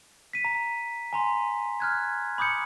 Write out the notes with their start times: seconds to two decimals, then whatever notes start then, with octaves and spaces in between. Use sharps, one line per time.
0.33 B6 D#7
0.45 A#5
1.13 G#5 A#5 C6
1.80 F6 F#6 G#6
2.38 B5 D6 D#6 G6 C#7